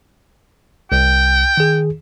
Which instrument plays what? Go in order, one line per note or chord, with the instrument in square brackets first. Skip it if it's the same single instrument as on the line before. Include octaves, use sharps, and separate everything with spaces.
[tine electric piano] C2 [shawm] G5
[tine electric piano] D#3 G#4